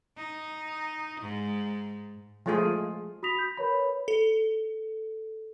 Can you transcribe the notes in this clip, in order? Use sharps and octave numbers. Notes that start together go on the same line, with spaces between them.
D#4
G#2
F3 G#3 A3 F4 G#4
F#4 B5 D#6 A#6 B6 F7
G6
A#4 B4 C#5 B5
A4